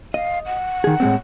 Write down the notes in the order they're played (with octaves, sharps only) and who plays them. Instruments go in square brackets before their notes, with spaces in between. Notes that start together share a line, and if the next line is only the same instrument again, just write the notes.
[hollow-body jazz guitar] D#5 [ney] F5
[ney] F#5
[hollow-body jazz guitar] D#3 G#4
A2 G#3 C4